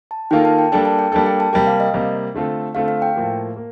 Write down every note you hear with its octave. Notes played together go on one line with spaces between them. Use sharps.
A5
D#3 A#3 F4 A4 G5
A5
G5
G3 A#3 D4 A4 G5
A5
G5
G3 A#3 D4 A4 G5
G5
A5
C3 G3 A#3 G5
F5
D#5
C3 G3 A#3
D3 A3 C4 F4 A4
D3 A3 C4 F4 A4 F5
F5
G5
A2 F3 A#3
A#3